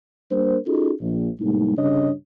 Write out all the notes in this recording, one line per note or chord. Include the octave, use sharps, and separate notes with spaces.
G3 A#3 D4 A#4 C5
C#4 D#4 F4 F#4 G#4 A4
A#1
A2 C3 G3 G#3 A#3 D#4
C2 G2 C#3 D4 C#5 D#5